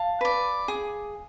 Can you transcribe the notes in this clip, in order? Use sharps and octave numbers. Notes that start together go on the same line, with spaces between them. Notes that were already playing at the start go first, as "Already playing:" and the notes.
Already playing: F5 A5
B4 D5
G#4